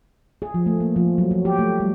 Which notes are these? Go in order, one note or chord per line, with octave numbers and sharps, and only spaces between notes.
G#4
F3
A3
A#3
F3
F#3
F#3
G4
A3
G3